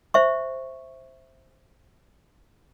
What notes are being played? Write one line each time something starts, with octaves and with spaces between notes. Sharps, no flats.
C5 E5 C#6